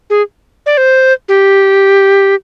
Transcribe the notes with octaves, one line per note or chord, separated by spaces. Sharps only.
G#4
D5
C5
G4